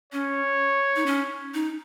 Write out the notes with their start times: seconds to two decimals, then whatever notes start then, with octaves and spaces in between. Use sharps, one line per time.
0.13 C#4 C#5
0.96 D#4
1.06 C#4
1.54 D#4